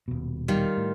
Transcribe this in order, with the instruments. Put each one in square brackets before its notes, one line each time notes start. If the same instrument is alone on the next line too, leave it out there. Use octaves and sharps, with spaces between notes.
[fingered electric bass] D#1 B2
[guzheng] D#3 F4 [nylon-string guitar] G3
[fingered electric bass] A2